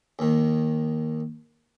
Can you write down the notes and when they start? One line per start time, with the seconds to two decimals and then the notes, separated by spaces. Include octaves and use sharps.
0.19 D#2 D#3